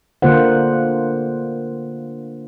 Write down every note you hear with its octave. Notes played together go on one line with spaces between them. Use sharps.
D3 A#3 F4 C5 F#5